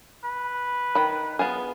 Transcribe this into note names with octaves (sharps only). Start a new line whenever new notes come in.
B4
D#3 B5
B3 F4 G#4